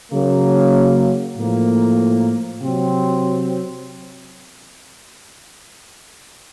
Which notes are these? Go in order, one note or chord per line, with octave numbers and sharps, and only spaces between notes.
C#3 F#3 A#3
A2 F3 A#3
C3 F#3 C4